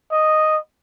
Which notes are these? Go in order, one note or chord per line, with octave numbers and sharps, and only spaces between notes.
D#5